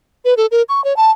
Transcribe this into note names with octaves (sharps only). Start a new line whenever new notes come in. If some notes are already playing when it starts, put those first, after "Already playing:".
B4
A4
A#4
C#6
C#5
A5